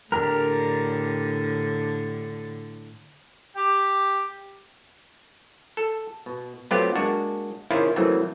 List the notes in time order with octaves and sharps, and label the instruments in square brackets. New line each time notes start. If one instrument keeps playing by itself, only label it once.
[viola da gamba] A2 D3 [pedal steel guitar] D4 G4 A#4
[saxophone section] G4
[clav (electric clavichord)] A4
B2
F#3 A3 B3 C4 F4 G4
G#3 A#3 D4 F#4
C3 D#3 C#4 E4 F4 G#4
C#3 E3 F#3 A3 A#3 C4